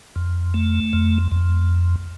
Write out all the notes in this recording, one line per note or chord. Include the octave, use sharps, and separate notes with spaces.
F2
A3
F2
F2